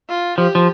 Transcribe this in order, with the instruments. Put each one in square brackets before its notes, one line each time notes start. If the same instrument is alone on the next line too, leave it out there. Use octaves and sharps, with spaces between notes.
[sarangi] F4
[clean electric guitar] F3 [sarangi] G4
[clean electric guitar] F3